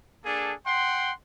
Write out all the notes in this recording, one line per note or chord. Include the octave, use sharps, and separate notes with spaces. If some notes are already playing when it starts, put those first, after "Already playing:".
A#3 D4 G#4 A4
F#5 G5 C6